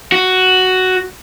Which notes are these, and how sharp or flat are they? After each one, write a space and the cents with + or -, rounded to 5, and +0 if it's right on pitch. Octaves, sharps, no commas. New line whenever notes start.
F#4 +5